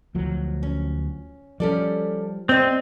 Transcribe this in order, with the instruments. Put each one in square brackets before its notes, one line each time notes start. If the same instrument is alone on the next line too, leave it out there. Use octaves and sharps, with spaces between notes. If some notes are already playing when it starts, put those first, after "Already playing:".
[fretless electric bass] D2 F3 F#3
[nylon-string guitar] C#4
[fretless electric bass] F3 G3 [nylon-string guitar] C#4 A4 D5
[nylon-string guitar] G3 G4 D#5 [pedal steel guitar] C4